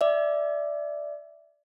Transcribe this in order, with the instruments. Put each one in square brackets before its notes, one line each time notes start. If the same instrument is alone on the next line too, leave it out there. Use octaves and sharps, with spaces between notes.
[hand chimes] D5 E5